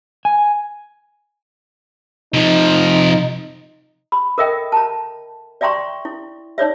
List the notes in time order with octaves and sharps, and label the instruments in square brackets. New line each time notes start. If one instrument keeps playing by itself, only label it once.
[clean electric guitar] G#5
[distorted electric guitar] C3 F3 [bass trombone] D#4
[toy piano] B5
A4 A#4 D#5 E5 G5
A5 A#5
D5 E5 G5 A#5 C6 C#6
E4
D#4 C#5 D5 E5